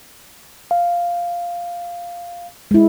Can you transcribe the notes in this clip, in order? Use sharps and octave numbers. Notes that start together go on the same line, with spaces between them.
F5
G#3 E4